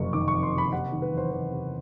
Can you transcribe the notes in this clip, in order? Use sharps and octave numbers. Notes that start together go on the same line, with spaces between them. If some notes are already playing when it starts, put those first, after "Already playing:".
Already playing: F#1 F2 C3 C#6
D#3 D6
C#6
F2
C6
C3
B5
C3 F#5
D#3
B4
E2
C5
E2 C5
C3